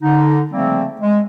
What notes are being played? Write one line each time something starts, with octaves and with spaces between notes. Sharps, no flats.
D3 D#4
C#3 F3 G3 A3 A#3 C4
G#3